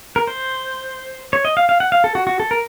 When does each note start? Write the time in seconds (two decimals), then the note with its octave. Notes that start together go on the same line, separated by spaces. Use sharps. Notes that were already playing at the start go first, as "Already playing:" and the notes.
0.16 A#4
0.27 C5
1.33 C#5
1.45 D#5
1.57 F5
1.69 F5
1.80 F#5
1.92 F5
2.04 A4
2.15 F#4
2.27 F#4
2.40 A4
2.51 A#4